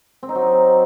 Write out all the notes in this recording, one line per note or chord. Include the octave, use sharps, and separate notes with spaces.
C4
D#4
F#3